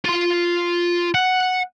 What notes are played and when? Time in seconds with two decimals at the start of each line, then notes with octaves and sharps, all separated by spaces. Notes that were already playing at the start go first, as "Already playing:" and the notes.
0.05 F4 C6
1.14 F#5